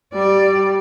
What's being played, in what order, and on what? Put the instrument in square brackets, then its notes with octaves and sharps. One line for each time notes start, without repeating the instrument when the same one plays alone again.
[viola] G3 [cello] D5